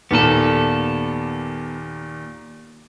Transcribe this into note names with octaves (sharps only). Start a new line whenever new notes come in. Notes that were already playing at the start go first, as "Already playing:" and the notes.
D#2 A#2 B3 A4